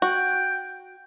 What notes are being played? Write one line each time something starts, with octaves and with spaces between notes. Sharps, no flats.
F#4 G5